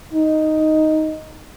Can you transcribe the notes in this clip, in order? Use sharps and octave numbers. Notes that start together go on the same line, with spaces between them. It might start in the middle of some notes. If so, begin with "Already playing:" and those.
D#4